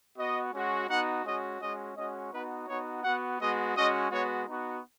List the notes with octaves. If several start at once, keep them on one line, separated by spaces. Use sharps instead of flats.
B3 F#4 D#5
G#3 C#4 F#4
B3 D#4 F#4 F#5
G#3 C#4 F#4 D#5
G#3 C#4 F#4 D#5
G#3 C#4 F#4 D#5
B3 D#4 F#4 B4
B3 D#4 F#4 C#5
B3 F#4 F#5
G#3 B3 F#4 D#5
G#3 C#4 F#4 D#5
G#3 B3 F#4 C#5
B3 D#4 F#4